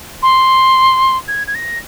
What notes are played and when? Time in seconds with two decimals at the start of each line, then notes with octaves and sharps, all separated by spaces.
0.23 C6
1.28 G#6
1.47 G#6
1.55 A#6